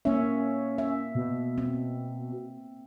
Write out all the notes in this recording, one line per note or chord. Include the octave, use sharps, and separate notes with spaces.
A#3 C#4 E5
E5
B2
C4